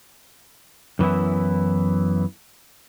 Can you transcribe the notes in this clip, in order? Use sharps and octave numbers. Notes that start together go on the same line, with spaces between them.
F#2 E3 B3 E4